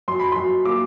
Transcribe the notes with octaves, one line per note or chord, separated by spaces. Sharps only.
F#2 C6
B5
F#2 C6
A#3 D6